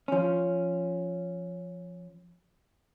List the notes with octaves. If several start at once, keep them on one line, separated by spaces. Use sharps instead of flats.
F3 C#4